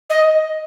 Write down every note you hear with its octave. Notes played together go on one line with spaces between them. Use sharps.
D#5